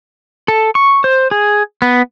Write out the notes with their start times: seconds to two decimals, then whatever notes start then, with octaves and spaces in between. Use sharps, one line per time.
0.48 A4
0.75 C#6
1.04 C5
1.31 G#4
1.82 B3